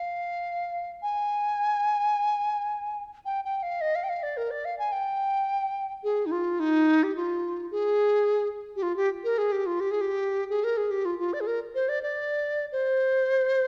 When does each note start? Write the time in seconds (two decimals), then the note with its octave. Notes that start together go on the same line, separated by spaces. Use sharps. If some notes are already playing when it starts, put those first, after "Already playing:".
Already playing: F5
1.02 G#5
3.25 G5
3.44 G5
3.63 F5
3.81 D#5
3.95 F5
4.03 G5
4.09 F5
4.23 D5
4.37 A#4
4.51 D5
4.65 F5
4.79 G#5
4.92 G5
6.04 G#4
6.26 D#4
6.32 F4
6.60 D#4
7.03 G4
7.16 F4
7.71 G#4
8.76 G4
8.82 F4
8.96 G4
9.24 A#4
9.38 G#4
9.52 G4
9.66 F4
9.80 G4
9.91 G#4
10.01 G4
10.50 G#4
10.64 A#4
10.77 G#4
10.91 G4
11.05 F4
11.19 F4
11.33 D5
11.40 G#4
11.47 A#4
11.75 C5
11.89 D5
12.03 D5
12.72 C5